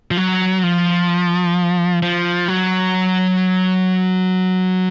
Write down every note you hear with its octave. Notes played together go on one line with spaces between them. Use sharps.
F3
F#3
F3
F3
F#3